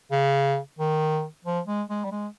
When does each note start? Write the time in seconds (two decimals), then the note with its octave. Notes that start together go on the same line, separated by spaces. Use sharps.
0.11 C#3
0.79 D#3
1.45 F3
1.67 G#3
1.90 G#3
2.05 G3
2.12 G#3